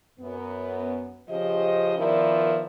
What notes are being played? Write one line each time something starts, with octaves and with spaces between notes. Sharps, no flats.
F#2 B3
C#3 F3 G4 C5 D#5
D#3 F3 B3 E4 A#4 D5